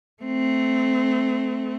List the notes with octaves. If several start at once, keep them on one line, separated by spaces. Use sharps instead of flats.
A3 C4